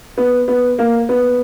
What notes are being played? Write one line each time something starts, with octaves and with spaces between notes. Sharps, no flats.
B3
B3
A#3
B3